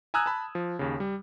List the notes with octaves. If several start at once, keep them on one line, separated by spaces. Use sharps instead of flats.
G#5 A#5 D#6 E6 F#6 G#6
A5 B5
F3
D#2 C#3
G3